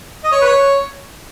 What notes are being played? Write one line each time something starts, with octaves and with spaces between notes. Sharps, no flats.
D#5
C#5
B4
C#5